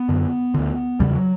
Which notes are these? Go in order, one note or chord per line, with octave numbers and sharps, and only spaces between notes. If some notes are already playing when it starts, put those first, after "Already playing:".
Already playing: B3
F#2 D3
D2 D3
E2 C#3 G3
F#3